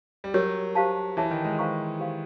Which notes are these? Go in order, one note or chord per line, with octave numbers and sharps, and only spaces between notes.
G3
F#3 G4 A#4 C#5
G4 C5 F5 A5
E3 E4 A4 C#5 E5 A5
D#3
G#3
A4 C5 F5 A#5 C#6
G4 C5 F5